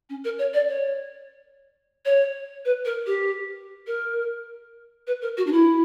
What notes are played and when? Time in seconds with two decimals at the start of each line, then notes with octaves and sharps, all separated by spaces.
0.10 C#4
0.25 A#4
0.39 C#5
0.54 D5
0.69 C#5
2.05 C#5
2.65 B4
2.85 A#4
3.06 G4
3.87 A#4
5.07 B4
5.22 A#4
5.37 F#4
5.47 D4
5.52 E4